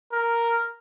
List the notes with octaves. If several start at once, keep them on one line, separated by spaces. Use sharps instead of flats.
A#4